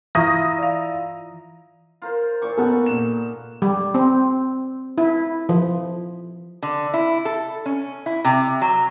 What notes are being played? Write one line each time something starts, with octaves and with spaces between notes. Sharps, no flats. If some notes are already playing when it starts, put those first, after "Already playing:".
E3 E4 F4 A#5 C#6 D#6 A#6
D5 F5
F4 A#4 C5
A#2 C#6 D6
B3 D#4 G#4 A4 F#5
A#2 E7
G3
C4
E4
F3
D3
E4
A4
C#4
E4
C3
F#3